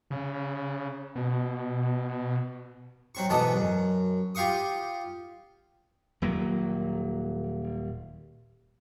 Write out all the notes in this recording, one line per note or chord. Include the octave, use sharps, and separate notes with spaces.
C#3
B2
F#3 C4 C#6
G#2 B2 E3 A4 D5 D#6
F#2
F4 G4 F5 C#6 D#6
D#1 F#3 A#3